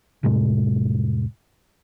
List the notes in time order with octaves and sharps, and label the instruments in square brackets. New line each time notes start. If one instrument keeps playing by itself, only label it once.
[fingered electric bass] F1 A2 C3 G#3